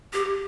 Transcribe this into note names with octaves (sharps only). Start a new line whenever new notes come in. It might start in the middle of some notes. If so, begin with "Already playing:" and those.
G4